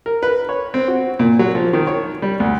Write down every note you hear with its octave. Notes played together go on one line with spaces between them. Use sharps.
A#4
B4
C#5
C4
F#4
A#2
F#3
F3
D#3
C#5
G3
D2